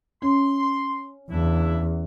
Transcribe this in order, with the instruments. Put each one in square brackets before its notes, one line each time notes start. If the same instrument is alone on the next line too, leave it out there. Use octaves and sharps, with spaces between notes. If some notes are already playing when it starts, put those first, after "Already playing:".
[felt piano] C#4 [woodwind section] C6
[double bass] E2 [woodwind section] C#3 D4 E4